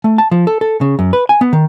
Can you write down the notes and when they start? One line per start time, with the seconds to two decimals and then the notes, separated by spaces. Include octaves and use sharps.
0.04 A3
0.18 A5
0.31 F3
0.47 A4
0.61 A4
0.81 C#3
0.99 F#2
1.13 B4
1.29 G#5
1.41 B3
1.53 D#3